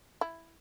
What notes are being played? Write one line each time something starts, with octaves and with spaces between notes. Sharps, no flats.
E4